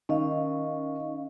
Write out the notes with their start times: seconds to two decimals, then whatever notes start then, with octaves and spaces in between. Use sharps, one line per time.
0.09 D#3 C#4 D#5 F5